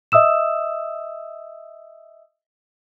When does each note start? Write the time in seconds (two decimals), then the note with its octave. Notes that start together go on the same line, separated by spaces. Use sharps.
0.12 D#5 E5 D#6 E6 E7